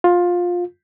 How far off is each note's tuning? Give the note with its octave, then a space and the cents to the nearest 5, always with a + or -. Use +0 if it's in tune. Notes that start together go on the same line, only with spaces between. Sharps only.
F4 +15